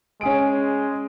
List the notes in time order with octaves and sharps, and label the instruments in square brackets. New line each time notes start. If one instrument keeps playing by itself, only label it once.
[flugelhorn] G#3 [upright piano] C#4 G#4 D7